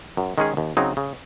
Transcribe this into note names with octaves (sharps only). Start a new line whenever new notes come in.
F#2
D#3 G#3 C#4 G#4
D#2
C#3 F#3 C4 D#4
C#3